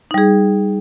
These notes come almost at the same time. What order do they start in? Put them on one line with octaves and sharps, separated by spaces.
D#4 G3 G#4